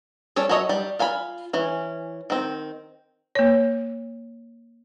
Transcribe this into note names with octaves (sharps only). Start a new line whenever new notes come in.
G3 C#4 A4 C#5
F#3 A4 C#5 D#5 E5
G3
F4 F5 G#5 B5
E3 C#4
D#3 C4
A#3 C#5